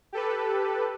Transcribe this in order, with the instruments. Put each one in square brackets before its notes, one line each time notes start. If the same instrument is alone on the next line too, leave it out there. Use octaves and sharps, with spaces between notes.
[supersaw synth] G4 A4 B4